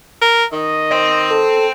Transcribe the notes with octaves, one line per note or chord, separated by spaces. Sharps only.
A#4
D#3 D#5
G5 C6
A4